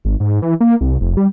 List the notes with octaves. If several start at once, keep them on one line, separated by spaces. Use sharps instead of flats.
G#1
G#2
E3
A#3
C2
F1
G3